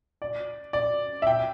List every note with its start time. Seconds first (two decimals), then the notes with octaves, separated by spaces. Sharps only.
0.22 D5
0.73 D5
1.22 E5
1.27 G5